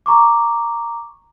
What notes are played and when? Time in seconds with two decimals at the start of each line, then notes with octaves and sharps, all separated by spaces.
0.06 A#5 C#6 D6